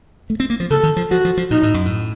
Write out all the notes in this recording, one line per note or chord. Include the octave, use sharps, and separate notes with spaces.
A3
C4
A#3
F3
C#3 A4
D#3
F3
F3 F#4
F3
F3
A#2 D#4
A2
F#2
A2